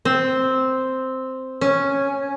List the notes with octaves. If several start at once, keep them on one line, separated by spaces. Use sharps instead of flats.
C4
C#4